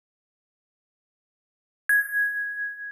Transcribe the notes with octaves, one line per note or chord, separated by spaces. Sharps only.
G#6